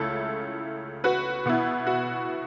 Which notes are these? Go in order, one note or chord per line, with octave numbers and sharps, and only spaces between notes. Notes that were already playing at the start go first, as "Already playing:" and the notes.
Already playing: C#2 C#3 A3 E4 A4
F#4 B4
B2 B3 E4
F#4